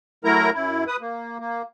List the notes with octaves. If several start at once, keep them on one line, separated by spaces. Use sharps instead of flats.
F#3 A3 E4 A#4 A#5
F#2 E4
B4 D#6
A#3
A#3